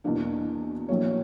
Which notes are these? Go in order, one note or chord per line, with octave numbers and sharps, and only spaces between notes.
E2 B2 A#3 D4
A#1 A#2 F#3 A#3 C#5